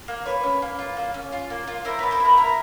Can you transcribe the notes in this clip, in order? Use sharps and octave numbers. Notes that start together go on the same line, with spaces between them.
A#3
A#3 B4 C#5
C#4
A#3
F4
A#3
C#4
F4
A#3
F4
E4 A#4 C5
B3 B4 C#5
A#4 C5
E4
A#4
E4 A#4